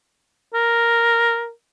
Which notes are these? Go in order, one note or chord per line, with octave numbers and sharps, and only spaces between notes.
A#4